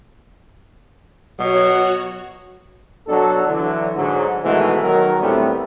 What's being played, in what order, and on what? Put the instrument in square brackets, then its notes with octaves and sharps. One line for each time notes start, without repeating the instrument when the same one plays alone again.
[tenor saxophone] B2 [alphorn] F#3 [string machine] F#4 C#5
[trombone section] B2 F#3 D4 A4
D3 E3 F#3
G#2 D3 F#3
G#2 B2 D#3 E3 G#3 A3
D#3 F#3 A#4
D2 A2 G3 A3 B3 C4